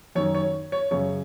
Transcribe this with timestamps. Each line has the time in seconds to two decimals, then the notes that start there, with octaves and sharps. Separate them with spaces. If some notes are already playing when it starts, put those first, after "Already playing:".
0.15 F#2 D#3 C#5
0.35 C#5
0.72 C#5
0.91 F#2 C#3 C#5